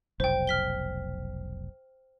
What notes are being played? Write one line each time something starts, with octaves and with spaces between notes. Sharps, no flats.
F1 B1 C5 G5
F6 B6 G7